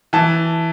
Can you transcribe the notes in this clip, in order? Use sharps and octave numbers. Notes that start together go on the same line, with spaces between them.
E3 A5